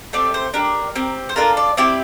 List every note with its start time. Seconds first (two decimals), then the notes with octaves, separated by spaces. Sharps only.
0.13 A3 C4 G4 D5
0.34 C5
0.54 D4 G4 A#4
0.96 C4 G4
1.29 C5
1.36 D4 F4 A4 A#4
1.57 D5
1.77 C4 E4 G4 D5